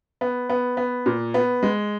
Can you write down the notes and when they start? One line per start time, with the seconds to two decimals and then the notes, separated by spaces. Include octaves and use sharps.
0.21 B3
0.49 B3
0.77 B3
1.06 A#2
1.34 B3
1.63 G#3